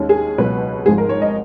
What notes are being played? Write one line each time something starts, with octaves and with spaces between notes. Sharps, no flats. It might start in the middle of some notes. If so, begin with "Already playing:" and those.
Already playing: D#2 D#3 G#3 C#4
G#4
C#2 B2 F#3 B4
G#1 G#2 F3 G#4
A#4
C#5
D#5